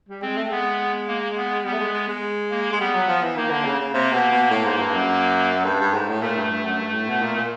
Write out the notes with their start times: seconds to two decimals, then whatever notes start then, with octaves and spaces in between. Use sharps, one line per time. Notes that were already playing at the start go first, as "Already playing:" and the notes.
0.09 G3
0.22 G#3 C4
0.37 A3
0.51 G#3 B3
1.08 A#3
1.37 B3
1.65 G3 B3
1.73 A3
1.79 G#3
1.93 G#3
2.08 G#3
2.51 A#3
2.72 G#3
2.79 G3 B3
2.94 F#3
3.08 F3
3.23 E3
3.36 D#3 A#3
3.50 D3
3.65 C#3
3.80 C#3
3.93 C3 A#3
4.12 B2
4.32 B2
4.50 A2
4.65 G#2
4.80 G2
4.94 F#2
5.65 G2
5.80 G2
5.94 G#2
6.08 A2
6.22 A#2 A3
6.37 G2
6.50 G2
6.65 F#2
6.79 G2
6.94 A2
7.08 B2
7.22 A#2
7.36 A#2